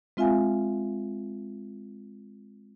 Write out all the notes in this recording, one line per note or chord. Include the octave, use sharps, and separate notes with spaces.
G#3 C4 F4 E5 F5 G#5